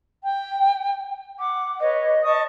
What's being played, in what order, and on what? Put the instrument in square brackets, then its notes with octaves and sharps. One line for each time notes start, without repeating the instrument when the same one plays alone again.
[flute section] G5
[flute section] F#5 [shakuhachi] D6
[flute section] B4 C#5 [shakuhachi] D#5
[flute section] A5 C#6 D#6